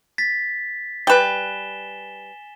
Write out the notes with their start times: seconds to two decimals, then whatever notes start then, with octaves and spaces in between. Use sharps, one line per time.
0.18 A6 B6
1.07 G3 B4 G#5 E7 G7